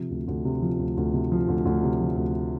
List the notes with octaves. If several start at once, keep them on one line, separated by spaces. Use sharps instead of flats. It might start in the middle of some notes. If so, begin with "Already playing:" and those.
Already playing: C3 F3
D2
D2
C3
F3
D2
D2
C3
F3
D2
D2
C3
F3
D2